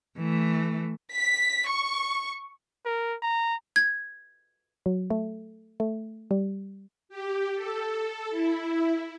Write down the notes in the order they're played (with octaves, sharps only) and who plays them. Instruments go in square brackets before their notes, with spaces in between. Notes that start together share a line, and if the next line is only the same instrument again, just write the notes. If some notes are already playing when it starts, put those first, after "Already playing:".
[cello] E3 A3
[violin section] B6
C#6
[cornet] A#4
A#5
[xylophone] G#6
[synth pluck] F#3
A3
A3
G3
[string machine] G4
A4
E4